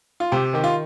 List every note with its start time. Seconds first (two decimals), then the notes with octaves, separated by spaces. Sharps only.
0.20 F4
0.32 C3 G4
0.53 D#3 G4
0.64 F4